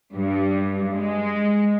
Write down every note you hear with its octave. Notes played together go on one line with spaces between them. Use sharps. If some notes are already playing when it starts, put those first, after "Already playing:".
G2
G#3